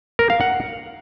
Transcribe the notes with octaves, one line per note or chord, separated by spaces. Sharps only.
A#4
F5
F#5